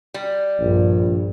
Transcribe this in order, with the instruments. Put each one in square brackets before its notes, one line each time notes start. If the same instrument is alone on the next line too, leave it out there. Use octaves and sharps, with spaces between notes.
[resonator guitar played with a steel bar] G3
[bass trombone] A#1 [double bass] G2